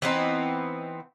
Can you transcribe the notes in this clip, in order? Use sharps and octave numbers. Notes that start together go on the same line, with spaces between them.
E3 B3 C4 D#4